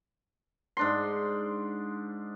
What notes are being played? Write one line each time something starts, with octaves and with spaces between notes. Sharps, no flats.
G#2 D4 C6